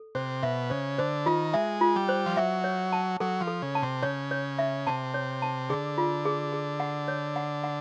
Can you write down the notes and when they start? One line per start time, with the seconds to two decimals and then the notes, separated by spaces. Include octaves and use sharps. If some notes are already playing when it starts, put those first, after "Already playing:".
Already playing: A4
0.15 C3 C5
0.43 B2 E5
0.70 C#3 C5
0.98 D3 C5
1.26 D#3 F4
1.53 G#3 E5
1.81 F4
1.96 G3
2.09 C5
2.26 F3
2.37 F#3 E5
2.64 C#5
2.92 A5
3.20 F#3 A4
3.40 F3
3.47 A4
3.62 C#3
3.75 A5
3.83 C3
4.03 C#3 C#5
4.31 C#5
4.59 E5
4.87 C3 A5
5.14 C#5
5.42 A5
5.69 D3 G#4
5.98 F4
6.25 G#4
6.52 G#4
6.80 F#5
7.08 C#5
7.36 F#5
7.64 F#5